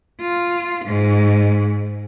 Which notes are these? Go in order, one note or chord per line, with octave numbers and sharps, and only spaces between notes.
F4
G#2